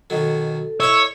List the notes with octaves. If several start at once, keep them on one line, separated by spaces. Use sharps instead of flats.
B2 D#3 F#3 A4
E4 C#5 D#5 C#6 E6